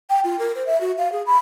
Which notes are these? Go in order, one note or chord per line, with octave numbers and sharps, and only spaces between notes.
G5
F4
A#4
C5
E5
F#4
F5
G#4
B5